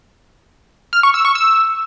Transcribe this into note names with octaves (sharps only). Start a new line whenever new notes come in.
F6
C#6
E6
C#6
E6